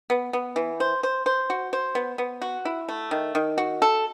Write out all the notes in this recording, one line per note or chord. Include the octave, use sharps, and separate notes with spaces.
B3
B3
E3
C5
C5
C5
F#4
C5
B3
B3
F#4
E4
A3
D#3
D#3
F#4
A4